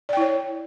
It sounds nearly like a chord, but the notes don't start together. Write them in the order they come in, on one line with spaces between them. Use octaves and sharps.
D5 G5 E4 C#5